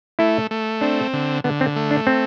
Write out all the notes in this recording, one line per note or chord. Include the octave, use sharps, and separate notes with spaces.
A3 E4
A3
C4 D4
D3
D3 B3
C4
A3
D4
C4